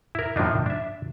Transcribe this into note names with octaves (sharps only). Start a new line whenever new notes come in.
E4 A#4
A2 F3 A#3 D4 D#4
D4 E5